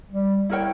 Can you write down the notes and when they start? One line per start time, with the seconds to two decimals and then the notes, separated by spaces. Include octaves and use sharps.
0.11 G3
0.50 E4 A#4 C#5 G5